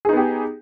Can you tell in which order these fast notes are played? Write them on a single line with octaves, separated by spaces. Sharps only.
G#4 D#4 B3 G4